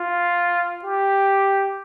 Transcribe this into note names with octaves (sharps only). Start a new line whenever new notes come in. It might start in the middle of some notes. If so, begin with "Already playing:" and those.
Already playing: F4
G4